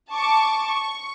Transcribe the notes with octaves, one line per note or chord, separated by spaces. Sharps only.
A5 C#6 D6
C#6